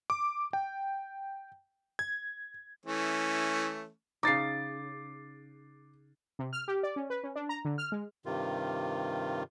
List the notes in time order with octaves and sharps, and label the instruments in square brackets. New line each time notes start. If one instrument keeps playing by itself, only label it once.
[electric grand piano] D6
G5
G#6
[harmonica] E3 A3 C#4
[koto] C#3 D#4 [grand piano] D6 A6 C7
[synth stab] C3
F6
G4
D5
C#4
B4
C#4
D4
A#5
D3
F6
G#3
[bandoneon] G2 C3 D#3 F4